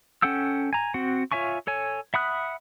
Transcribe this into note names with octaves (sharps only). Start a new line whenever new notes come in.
C#4 A4 F#5 G5 E6
G#5 A#5
C4 F#4 F#5
F4 C#5 E5 G#5 C#6
A4 C#5 G#5
E5 F#5 B5 D#6 F#6